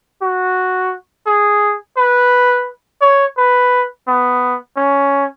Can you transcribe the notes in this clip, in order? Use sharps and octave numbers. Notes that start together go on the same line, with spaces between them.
F#4
G#4
B4
C#5
B4
B3
C#4